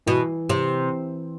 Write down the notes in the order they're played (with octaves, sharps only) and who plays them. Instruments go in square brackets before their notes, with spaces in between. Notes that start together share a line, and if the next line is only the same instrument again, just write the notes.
[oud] B2 [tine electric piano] E3
[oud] C3